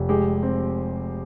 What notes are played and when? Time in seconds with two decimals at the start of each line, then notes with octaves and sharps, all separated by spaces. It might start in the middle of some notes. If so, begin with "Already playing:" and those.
Already playing: F1
0.09 G#3 G4
0.43 C4